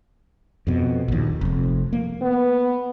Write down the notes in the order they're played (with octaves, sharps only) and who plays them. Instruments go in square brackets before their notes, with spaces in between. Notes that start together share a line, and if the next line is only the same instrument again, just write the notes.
[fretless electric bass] F2 B2
A#1 D#2
F1 F2
A#3
[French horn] B3